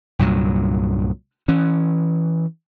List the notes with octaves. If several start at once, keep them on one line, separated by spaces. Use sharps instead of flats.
C2 G2 A#2 F#3
E3 C#4